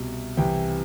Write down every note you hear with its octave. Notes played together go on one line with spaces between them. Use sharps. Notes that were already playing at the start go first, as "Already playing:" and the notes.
Already playing: C2 B2
C2 C3 E3 G5